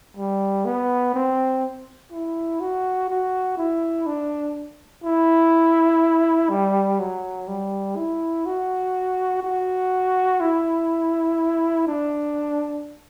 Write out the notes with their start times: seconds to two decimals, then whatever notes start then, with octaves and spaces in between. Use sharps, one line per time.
0.17 G3
0.65 B3
1.14 C4
2.12 E4
2.60 F#4
3.09 F#4
3.57 E4
4.07 D4
5.04 E4
6.50 G3
7.00 F#3
7.47 G3
7.96 E4
8.46 F#4
9.43 F#4
10.40 E4
11.87 D4